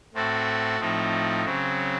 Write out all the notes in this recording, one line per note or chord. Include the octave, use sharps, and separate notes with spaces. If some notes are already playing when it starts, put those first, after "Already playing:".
A2 A3 C4 F#4 A4
A2 F3 A3 C4 D#4
C#3 F#3 C4